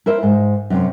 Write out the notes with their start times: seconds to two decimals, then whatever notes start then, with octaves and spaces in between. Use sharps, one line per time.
0.06 E4 A#4 C5 E5
0.23 G#2
0.70 F#2 C3